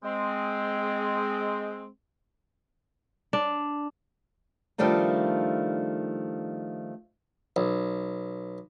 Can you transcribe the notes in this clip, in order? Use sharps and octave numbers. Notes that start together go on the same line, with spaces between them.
G#3 C4
D4
D#3 F3 G3 A3 D4 D#4
B1